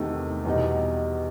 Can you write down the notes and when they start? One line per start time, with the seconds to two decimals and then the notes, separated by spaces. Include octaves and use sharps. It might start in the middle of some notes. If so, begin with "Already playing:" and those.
Already playing: E2 C3 D#3 A3 D#4
0.45 E2 B2 G3 D#4